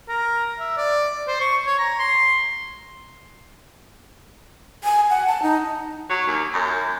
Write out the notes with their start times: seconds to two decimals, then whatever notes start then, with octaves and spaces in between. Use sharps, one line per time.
0.09 A#4
0.60 E5
0.77 D5
1.28 C5
1.41 C#6
1.67 C#5
1.79 A#5
1.99 C6
4.84 G#5
5.10 F#5
5.27 A5
5.42 D#4
6.10 F#3
6.27 D#2
6.54 F#2